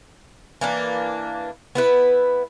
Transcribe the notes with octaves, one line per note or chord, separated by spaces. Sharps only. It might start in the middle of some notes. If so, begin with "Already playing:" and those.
E3 A#3 D4
B3 E4 B4